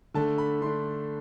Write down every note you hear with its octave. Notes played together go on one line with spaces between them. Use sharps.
D3 A3 D4 A5
B5
D3 A3 D4 C6